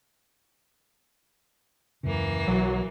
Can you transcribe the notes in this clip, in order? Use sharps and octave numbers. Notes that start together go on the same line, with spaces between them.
D#1 F#2 C#3 E3 A#3
B1 F#3